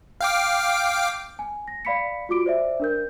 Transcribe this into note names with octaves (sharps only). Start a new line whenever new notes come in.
F5 G5 D6
G#5
A#6
D5 F5 B5 B6 C#7
F4 F#4 D6 D7
C5 D5 E5
D4 A#4 G6